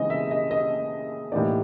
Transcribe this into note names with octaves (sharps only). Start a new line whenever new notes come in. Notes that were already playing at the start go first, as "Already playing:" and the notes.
Already playing: C#3 E3 G#3 C4 D#4 D#5
E5
D#5
D#5
A2 E3 G3 A#3 D#4 D5